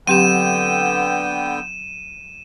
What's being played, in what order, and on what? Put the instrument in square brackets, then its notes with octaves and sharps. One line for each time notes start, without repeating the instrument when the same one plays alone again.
[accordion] D3 B3 G5 [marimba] F#3 C4 G4 [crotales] D#7 E7